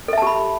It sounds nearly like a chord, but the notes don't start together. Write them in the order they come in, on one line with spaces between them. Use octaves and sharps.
A4 E5 A5 G4 B5